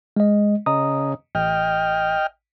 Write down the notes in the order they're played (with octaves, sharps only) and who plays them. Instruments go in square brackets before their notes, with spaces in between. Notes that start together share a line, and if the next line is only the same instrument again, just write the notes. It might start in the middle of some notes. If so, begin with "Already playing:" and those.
[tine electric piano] G#3 D#5
[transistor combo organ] C#3 [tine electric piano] D#5 A#5 D#6
[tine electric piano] A1 [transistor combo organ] D#5 G5 F6